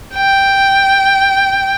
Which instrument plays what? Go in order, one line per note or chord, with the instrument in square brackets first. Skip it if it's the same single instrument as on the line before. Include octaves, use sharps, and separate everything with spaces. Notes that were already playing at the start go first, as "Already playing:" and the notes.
[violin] G5